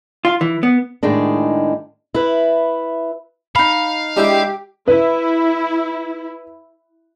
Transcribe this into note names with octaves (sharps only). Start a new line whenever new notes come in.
F4
E3
B3
A2 D#3 G#3 D4
E4 B4
D#4 F5 B5
G#3 D4 E4 G4
E4 B4